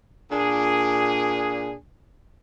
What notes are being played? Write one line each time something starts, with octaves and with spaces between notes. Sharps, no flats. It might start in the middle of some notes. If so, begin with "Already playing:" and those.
A#2 D4 G#4